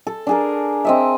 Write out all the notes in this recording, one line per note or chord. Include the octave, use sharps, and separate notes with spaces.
A4
D4 G#4 A#4
C4 D#5 E5